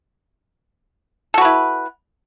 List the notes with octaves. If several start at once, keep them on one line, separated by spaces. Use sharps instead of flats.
E4 F#4 A4 B4